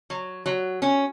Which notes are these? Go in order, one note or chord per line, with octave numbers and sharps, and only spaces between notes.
F#3
F#3
C#4